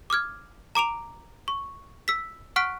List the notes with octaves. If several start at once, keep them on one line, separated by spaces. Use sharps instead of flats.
D6 D#6 F6 G#6
A#5 D6 D7 F7
C#6
E6 B6
F#5 C#6 F6 F#6 B6 D7